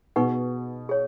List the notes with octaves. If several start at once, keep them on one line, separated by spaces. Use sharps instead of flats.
B2 D#4 G#4 B4 F#5 C#6
G#4 C#5